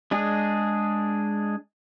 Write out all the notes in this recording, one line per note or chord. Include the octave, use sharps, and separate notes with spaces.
G#3 D4 G#4